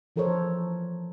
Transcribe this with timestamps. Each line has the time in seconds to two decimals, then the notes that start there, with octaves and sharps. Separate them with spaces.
0.16 E3 F3 A4 A#4 C5 C#5